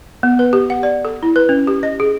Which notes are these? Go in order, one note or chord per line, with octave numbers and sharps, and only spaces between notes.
B3
B4
G4
F#5
D5
A4
E4
B4
C#4
G4
D#5
G#4